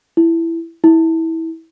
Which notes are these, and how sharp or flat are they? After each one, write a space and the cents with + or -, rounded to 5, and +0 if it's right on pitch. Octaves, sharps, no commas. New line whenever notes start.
E4 +10
E4 -20